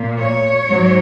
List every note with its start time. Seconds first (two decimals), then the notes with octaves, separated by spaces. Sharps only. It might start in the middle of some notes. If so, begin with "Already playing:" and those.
Already playing: A#2 A#3
0.20 C#5
0.69 G#2 F#3